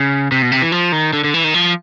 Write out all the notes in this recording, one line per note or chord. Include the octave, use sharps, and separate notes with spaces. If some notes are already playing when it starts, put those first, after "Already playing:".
Already playing: C#3
C3
B2
C3
E3
F3
D#3
D3
D3
E3
D#3
F3